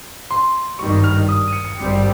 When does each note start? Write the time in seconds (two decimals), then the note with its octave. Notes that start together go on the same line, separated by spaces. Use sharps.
0.31 C6
0.79 G#1 G2 D#3 G3 C#6
1.04 F6
1.29 D#6
1.48 D#7
1.53 C#7
1.65 C#7
1.78 G#1 G2 G3 C4 G4 C#7